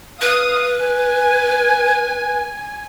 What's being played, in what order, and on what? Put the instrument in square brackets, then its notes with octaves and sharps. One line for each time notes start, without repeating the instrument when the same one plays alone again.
[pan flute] B4 [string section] F5 D#6
[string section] G#5